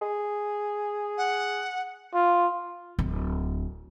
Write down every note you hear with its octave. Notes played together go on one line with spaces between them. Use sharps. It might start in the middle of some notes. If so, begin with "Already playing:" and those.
G#4
F#5
F4
D1